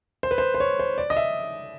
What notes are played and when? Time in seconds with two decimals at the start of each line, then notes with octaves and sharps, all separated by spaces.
0.23 C5
0.31 B4
0.38 C5
0.54 C5
0.60 C#5
0.80 C5
0.98 D5
1.10 D#5
1.17 E5